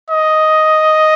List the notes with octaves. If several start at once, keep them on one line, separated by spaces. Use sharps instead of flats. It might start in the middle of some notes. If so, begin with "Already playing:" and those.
D#5